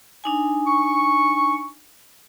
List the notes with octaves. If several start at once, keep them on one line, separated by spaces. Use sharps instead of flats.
D4 D#4 G#5
C#6